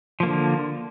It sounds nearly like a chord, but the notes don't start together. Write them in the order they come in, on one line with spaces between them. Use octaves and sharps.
F3 A#3 D3